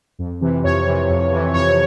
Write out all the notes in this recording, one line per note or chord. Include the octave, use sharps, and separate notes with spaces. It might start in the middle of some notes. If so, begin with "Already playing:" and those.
F2
C3 E3
F2 C#5
C3 E3
F2
C3 E3
F2 C#5